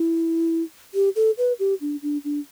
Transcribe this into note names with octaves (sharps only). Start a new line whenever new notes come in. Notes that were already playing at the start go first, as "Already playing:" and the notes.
Already playing: E4
G4
A4
B4
G4
D4
D4
D4